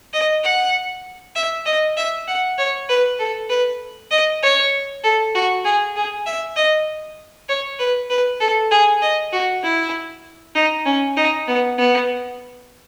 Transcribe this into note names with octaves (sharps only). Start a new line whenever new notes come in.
D#5
F#5
E5
D#5
E5
F#5
C#5
B4
A4
B4
D#5
C#5
A4
F#4
G#4
G#4
E5
D#5
C#5
B4
B4
A4
G#4
D#5
F#4
E4
D#4
C#4
D#4
B3
B3